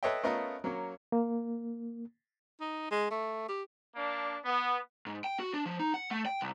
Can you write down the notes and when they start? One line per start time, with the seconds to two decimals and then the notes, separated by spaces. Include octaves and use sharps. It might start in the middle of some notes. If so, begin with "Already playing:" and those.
0.03 A4 B4 C#5 D#5 E5 G5
0.23 A3 B3 C#4 F4 A#4 D#5
0.64 F#3 A#3 C#4
1.12 A#3
2.60 D#4
2.91 G#3
3.11 A3
3.49 G4
3.95 A#3 D4
4.44 B3
5.06 G#2
5.24 G5
5.40 F#4
5.54 D4
5.66 F3
5.79 D#4
5.94 F#5
6.11 A3
6.26 G5
6.41 C2